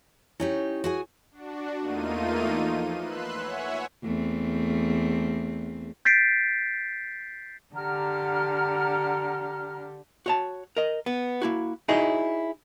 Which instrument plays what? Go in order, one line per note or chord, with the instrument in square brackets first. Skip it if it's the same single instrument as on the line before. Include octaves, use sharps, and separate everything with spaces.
[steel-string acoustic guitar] C#4 D#4 G4 [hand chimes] E4 C#5
[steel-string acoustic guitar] F#4 G#4 G#5
[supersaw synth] D4 F#4
E2 A3 A#3 D#4 F4 D#7
F3
B4 C6 E6 F#6
C#5 E5 F#5 G#5
[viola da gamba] E2 A3 C4
[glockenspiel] G6 A6 B6 C7 D7
[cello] D3 G4 [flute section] F#5 A#5 F6
[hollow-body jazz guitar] F#4 C#5 A5
A#4 D#5
B3
A#3 E4 F#4
D#4 E4 F#4 G#4 C#5 D#5